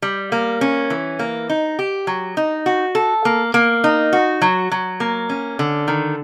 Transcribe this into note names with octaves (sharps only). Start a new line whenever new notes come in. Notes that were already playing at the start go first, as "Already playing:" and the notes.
G3
A#3
C#4
E3
A#3
D#4
G4
F#3
D#4
F#4
A4
A#3
A#3
D#4
F#4
F#3
F#3
A#3
C#4
D3
D#3